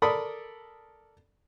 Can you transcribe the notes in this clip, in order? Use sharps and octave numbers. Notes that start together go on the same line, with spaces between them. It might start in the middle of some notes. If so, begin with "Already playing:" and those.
A4 A#4 D5 B5 D#6